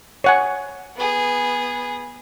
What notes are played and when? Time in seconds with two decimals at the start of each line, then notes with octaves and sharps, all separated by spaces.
0.24 C#5 F#5 G#5
0.96 B3 G#4